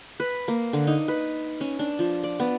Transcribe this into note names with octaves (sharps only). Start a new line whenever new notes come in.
B4
A#3
D3
D#4
B4
C#4
D4
F3
D5
B3